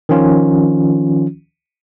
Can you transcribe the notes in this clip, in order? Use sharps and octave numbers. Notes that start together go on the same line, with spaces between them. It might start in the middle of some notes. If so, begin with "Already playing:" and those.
D#3 F3 C#4 F4